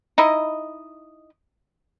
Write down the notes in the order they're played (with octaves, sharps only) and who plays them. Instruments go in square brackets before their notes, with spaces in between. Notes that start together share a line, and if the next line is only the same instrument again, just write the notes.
[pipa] D#4 E4 D#5